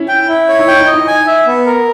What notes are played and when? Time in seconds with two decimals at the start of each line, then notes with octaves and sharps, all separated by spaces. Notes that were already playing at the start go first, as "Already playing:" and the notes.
Already playing: C#4 E4
0.08 G5
0.28 E4
0.48 C#5
0.59 D#4
0.67 E4 G5
0.80 D#4
0.87 D#5
0.94 D#4
1.07 G#5
1.27 E5
1.46 B3
1.66 A#4